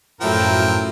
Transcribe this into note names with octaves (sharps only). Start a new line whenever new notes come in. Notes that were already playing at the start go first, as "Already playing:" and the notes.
F#2 A2 F3 F#3 A3 E4 A#4 G5